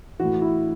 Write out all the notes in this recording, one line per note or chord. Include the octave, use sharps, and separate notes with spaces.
A2 E3 F#4
E4